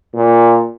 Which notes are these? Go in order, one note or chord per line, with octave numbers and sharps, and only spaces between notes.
A#2